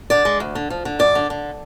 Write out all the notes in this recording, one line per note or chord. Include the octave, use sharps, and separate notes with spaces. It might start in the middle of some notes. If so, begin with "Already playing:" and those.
D3 D5
G#3
D2
D3
F3
D3
F#2 D5
D3
D3